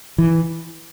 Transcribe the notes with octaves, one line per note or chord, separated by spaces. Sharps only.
E3